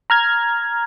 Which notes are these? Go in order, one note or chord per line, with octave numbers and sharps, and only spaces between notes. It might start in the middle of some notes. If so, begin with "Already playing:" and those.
A#5 F6 G#6